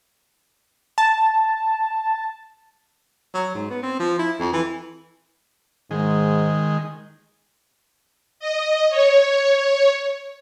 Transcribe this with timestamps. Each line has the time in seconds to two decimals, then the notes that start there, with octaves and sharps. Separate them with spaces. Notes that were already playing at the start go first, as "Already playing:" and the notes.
0.98 A5
3.34 F#3
3.55 G#2
3.70 B3
3.83 C4
4.00 F3
4.19 E4
4.40 F2
4.53 E3
5.91 G#2 D#3 G#3
8.40 D#5
8.90 C#5